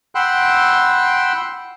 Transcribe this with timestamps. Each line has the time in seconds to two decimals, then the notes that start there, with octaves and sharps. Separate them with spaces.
0.15 F#5 G5 B5 C6 E6 F#6